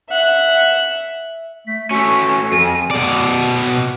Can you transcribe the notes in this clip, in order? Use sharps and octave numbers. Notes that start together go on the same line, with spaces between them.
E5 F#5
A3 B6
A3 C#4 F#4 G#5
F2 A4 D#7
B2 D5